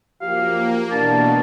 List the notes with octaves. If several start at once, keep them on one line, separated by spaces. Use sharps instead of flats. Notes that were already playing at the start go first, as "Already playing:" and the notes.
F#2 F3 A#3 G4 F5
B2 E3 D4 A5